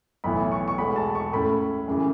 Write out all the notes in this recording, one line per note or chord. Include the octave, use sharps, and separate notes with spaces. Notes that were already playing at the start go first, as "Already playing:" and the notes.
B1 A2 E3 B3 E4 B5
C#6
C#6
E1 E2 E3 A3 B5
A5
C#6
A2 A3 C#4 B5
F#2 C#3 E3